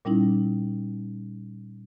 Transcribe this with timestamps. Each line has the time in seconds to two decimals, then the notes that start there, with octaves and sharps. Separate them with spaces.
0.05 A#2 G3 C#4 D#4 E4